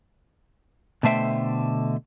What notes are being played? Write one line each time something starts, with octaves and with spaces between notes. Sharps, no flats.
B2 D3 A3 C5 E5 G5